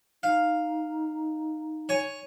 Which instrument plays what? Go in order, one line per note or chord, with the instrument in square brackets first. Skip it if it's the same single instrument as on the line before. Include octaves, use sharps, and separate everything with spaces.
[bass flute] D#4 [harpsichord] F5
[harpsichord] C#5 G#5